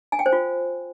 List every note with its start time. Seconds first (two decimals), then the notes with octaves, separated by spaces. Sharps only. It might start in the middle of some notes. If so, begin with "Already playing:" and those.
0.12 G#5
0.19 G5
0.26 C5
0.33 F4